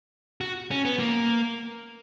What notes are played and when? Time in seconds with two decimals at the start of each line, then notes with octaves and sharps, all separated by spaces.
0.41 F#4
0.71 C#4
0.85 B3
0.99 A#3